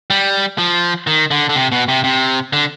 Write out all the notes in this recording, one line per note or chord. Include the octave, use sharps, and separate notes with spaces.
G3
F3
D#3
D3
D3
C3
B2
C3
C3
D3